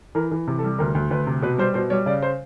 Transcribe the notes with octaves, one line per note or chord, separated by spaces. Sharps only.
E3 A#4
E3
C3
A4
G3
D2 A#4
D2
D2 B4
C3
B2 B4
G3 C5
B2 C5
G3 C#5
C#3 D5
C5